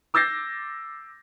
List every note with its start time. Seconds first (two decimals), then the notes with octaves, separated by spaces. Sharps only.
0.14 D6 E6 G6 A6 A#6 C7